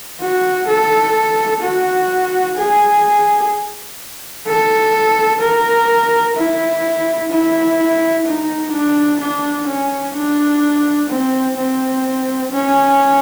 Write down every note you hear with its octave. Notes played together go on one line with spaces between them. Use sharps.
F#4
A4
F#4
G#4
A4
A#4
E4
E4
D#4
D4
D4
C#4
D4
C4
C4
C#4